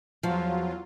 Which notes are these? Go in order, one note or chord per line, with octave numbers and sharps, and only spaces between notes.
E2 F3 F#3 F4